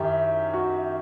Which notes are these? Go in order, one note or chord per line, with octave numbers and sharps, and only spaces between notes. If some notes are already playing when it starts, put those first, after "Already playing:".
Already playing: F#2 D#3 E4 G4
F#4